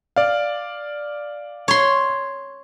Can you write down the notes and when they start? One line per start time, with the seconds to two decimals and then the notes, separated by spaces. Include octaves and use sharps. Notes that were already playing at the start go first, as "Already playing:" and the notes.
0.16 D5 F5
1.68 C#5 C6